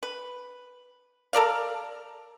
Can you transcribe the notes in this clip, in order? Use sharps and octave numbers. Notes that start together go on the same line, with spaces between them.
B4
A4 A#4 D5 F5